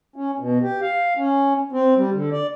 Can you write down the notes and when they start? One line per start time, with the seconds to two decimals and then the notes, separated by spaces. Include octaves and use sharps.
0.16 C#4
0.40 B2
0.62 G4
0.82 F5
1.17 C#4
1.72 C4
1.97 G3
2.14 D3
2.32 D5